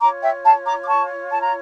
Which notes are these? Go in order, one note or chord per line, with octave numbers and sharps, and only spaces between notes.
F4 C#5 A#5 D6
E5 G5
F5 A5
A#5 D6
D6
A5 C#6
A5
A#5